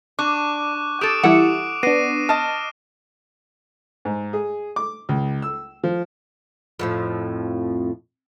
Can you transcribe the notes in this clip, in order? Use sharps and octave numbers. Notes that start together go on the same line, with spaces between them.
D4 C#6 D6 F#6
G4 A4 D#6 D7 E7
E3 G3 E4 A4 F#5 D6
B3 D4 A#6 C7 D#7
D#5 A5 F6
G#2
G#4
D6
C#2
E6
F3
F2 A2 F3